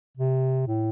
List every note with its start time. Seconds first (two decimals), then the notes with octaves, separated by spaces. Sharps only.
0.17 C3
0.67 A2